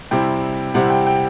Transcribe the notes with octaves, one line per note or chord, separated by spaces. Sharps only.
C3 G3 C4 E4 G5
C3 G3 C4 E4 F#5
G5
G5